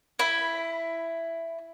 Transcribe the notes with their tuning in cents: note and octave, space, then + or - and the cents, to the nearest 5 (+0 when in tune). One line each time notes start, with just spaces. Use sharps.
E4 +10 B5 +0